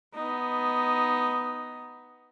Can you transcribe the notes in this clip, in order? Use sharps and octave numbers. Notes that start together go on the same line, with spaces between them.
B3 D#4